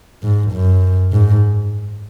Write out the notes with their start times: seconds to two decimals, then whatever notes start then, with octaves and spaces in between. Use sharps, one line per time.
0.23 G#2
0.52 F#2
1.12 G#2